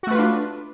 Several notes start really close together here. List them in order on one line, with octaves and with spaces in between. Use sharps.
F#4 A3 B4 F4 D4